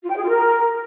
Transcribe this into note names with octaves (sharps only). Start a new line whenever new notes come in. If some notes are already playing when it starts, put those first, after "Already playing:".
F4
G5
G#4
F4
A#4